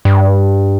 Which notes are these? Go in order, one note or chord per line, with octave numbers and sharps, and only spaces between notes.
G2